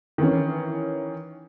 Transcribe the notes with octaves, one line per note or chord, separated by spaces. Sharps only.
D#3 E3 C#4